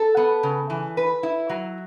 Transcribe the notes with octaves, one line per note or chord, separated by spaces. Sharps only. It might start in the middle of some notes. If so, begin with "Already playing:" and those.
Already playing: A4
B3
C#3
E3
B4
E4
F#3